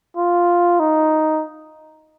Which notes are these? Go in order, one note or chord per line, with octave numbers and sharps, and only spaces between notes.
F4
D#4